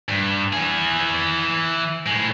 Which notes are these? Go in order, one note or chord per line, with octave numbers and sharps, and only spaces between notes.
G2
E3 G#4
A2 G#3